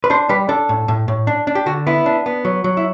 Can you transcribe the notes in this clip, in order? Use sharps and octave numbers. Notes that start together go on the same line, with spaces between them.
B4
D4 C5
G3 B4
D4 A4
A2
A2
A2
D4
D4
G4
D3 F#4
B3 E4
D4
B3
F#3
F#3
E4